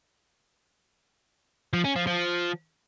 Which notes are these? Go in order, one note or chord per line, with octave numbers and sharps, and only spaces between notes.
F3
C#4
F3
F3